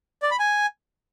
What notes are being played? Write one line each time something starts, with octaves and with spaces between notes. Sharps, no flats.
D5
B5
G#5